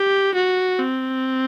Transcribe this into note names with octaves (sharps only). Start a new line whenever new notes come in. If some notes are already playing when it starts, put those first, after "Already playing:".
Already playing: G4
F#4
C4